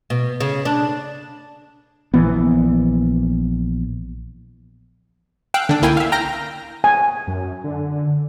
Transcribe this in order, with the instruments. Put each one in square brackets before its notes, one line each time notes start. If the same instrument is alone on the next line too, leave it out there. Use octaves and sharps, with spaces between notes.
[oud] B2
C#3
D4
[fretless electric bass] A#1 E3 B3
[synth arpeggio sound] F5 G5 E6 F#6 D7
D3 D4
C#2 A#3 E4 G5 G#5
E5 F5
G5 A#5 F6 G6 A#6
[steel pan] G#5
[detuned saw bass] F#2
D3